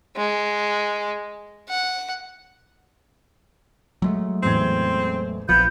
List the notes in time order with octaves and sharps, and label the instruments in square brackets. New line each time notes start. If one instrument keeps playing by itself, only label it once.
[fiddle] G#3
F#5
[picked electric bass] F#3 G#3 A3
[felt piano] A1 E2 G#6 [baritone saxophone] C4
[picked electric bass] A#1 F3 [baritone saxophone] B3 [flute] G6